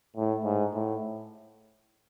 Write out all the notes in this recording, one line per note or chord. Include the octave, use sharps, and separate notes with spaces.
A2
G#2
A2